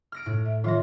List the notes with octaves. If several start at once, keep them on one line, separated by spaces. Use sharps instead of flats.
F6 A#6 D7
A2
E5
D#3 F3 F4 C#5